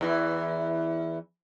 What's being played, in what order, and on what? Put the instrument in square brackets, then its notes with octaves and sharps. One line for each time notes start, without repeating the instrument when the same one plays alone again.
[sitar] E2 E3